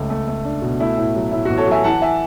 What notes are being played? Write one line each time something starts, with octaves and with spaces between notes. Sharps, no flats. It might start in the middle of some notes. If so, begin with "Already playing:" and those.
Already playing: C#2 A3
A3
A3
D4
B2
A3 E4
A2
F#3
A2 E4
F#4
A1
A4 C#5
F#3 E5 G#5
E3 F#5 A5
E5 G#5